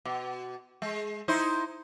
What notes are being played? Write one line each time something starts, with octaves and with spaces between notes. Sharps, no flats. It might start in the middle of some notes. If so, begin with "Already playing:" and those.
B2
G#3
D#4 E4 C5